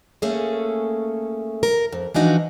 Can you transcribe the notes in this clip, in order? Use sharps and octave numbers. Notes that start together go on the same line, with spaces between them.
A3 A#3 C#4 G#4 A4
A#4
F2
E3 F3 D4 D#4 F#4